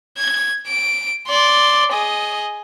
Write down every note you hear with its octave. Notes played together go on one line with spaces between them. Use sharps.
G#6
D7
D5 C6
G#4 D#5